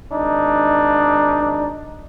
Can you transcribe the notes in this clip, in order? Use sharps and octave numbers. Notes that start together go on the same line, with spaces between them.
G#1 D4 D#4